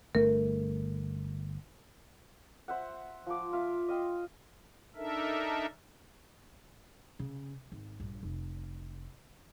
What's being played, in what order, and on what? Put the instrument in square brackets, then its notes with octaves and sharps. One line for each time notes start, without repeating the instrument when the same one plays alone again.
[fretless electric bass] G1 A3 [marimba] A#4
[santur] C5 E5 F#5
F3 D6
F4 E5 F5
D#5 F5 G5 C6
[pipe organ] D4 D#4 A4 A#4 E5
[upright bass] C#3
G#1
A#1 G2
F1